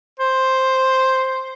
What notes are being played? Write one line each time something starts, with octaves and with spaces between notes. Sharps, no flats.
C5